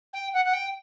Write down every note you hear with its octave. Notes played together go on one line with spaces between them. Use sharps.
G5
F#5
F#5
G5